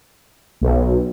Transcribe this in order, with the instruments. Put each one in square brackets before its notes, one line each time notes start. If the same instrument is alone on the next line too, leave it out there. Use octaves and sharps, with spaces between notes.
[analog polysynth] B1